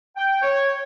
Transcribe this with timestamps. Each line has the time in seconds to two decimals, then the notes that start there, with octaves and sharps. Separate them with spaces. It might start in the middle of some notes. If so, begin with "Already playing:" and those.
0.16 G5
0.42 C#5